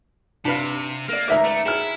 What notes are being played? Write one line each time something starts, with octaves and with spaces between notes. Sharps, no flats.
C3 D4 B4 F5
A#3 A#4 D5
C#2 D#3 B4 D5 E5 A#5
A3
E4 G#4 F6